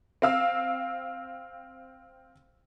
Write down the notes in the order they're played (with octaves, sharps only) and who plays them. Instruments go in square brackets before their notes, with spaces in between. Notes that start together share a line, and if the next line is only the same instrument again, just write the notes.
[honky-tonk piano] C4 F5 E6